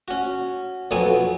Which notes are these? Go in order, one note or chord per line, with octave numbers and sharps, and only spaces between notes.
C#4 F#4
B1 F2 F#3 B3 C#5 G#5